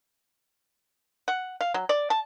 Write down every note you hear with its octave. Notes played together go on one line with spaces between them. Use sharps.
F#5
F5
F#3
D5
A5